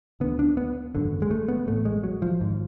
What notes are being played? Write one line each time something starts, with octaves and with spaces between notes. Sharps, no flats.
D2 D3 B3
D4
B3
G#1 F#2 D3
G#3
A3
B3
A1 A2 A3
G#3
F#3
F3
G#1 G#2